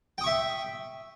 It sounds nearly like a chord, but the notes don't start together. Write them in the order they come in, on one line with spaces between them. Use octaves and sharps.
G5 D#6 C#6 E5